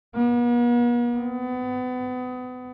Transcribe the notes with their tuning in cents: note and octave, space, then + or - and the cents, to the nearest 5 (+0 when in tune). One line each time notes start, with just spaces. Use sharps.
B3 -45
B3 +30